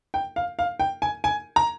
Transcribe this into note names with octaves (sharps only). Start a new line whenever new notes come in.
G5
F5
F5
G5
G#5
G#5
A#5